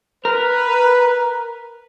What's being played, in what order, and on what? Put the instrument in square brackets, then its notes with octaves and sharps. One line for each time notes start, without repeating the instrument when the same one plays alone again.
[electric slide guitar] A#4 [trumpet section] B4